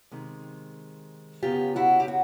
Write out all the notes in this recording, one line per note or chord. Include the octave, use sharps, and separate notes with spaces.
C3 D#3 G#3
F#2 C#3 F#3 B3 F4 G4
E4 F#4
G4
F#4